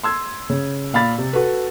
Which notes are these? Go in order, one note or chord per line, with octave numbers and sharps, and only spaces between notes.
C6 E6 G#6
C#3
A#2 F5 B5 A6
C3
F#4 A4 B4